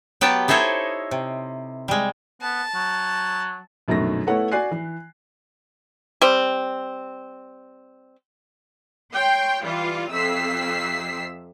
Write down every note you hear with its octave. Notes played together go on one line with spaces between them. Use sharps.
F#3 B3 G4 G5 A5
D#4 E4 A4 C5 C#5 D#5
C3
G3 G#3
B3 A5
F#3
A#1 F#2 B2 D#3 A3 A#6
A3 B3 E4 A4 C#5 F#5
F#4 D5 G#5 F#6 C7
E3
G3 C4
C#5 G5 C6
E3 G3 F4
F2 C3 E6 B6 C7